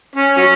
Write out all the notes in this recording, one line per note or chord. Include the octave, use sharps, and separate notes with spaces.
C#4
F#3 C#4